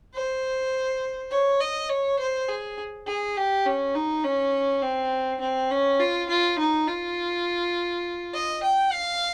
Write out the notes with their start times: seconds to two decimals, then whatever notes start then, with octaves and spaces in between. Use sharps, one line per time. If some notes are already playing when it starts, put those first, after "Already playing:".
0.14 C5
1.31 C#5
1.60 D#5
1.89 C#5
2.19 C5
2.49 G#4
3.06 G#4
3.37 G4
3.65 C#4
3.94 D#4
4.24 C#4
4.82 C4
5.40 C4
5.71 C#4
6.00 F4
6.29 F4
6.59 D#4
6.87 F4
8.33 D#5
8.63 G5
8.92 F5